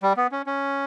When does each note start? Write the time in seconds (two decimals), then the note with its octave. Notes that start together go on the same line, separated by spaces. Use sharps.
0.03 G3
0.17 B3
0.32 C#4
0.47 C#4